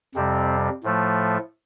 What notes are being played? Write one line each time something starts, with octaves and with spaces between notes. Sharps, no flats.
F2 C3 G3 C4
A2 F3 A3